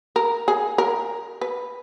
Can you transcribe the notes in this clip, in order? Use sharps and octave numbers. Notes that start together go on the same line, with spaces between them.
A#4
G#4
A#4
B4